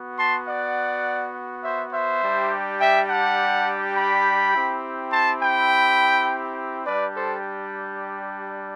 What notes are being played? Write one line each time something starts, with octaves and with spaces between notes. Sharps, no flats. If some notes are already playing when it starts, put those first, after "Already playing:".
Already playing: B3 F#4
A5 C6
D5 F#5
C5 E5
C5 E5
G3 D4 G4
E5 G5
F#5 A5
G5 B5
C4 E4 G4
A5 C6
G5 B5
G3 D4 G4 B4 D5
A4 C5